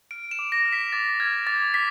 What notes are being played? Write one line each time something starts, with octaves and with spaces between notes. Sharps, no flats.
F6 D7
E7
D6
A#6
F6
B6
D6 A6
F6 G#6
D6 A6
D6 B6